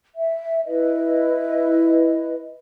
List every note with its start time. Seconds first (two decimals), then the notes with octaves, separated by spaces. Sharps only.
0.16 E5
0.65 E4 B4 D#5